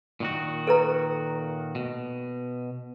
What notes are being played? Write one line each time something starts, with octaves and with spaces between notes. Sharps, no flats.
A#2 D#3 F#4
A4 B4 A#5
B2